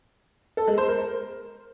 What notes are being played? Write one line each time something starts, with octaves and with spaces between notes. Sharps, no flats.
A4
G#3
C5
A#4